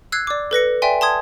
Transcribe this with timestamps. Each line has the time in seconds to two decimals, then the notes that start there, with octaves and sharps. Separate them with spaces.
0.12 E6 F#6 G#6 C7
0.27 D5 D6
0.51 A4 B4 A#6 C#7
0.82 D5 E5 G5 G#5 C6
1.01 A5 C6 D#6 G#6